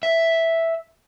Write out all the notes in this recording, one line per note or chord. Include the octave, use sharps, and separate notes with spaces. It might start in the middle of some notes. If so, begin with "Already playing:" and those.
E5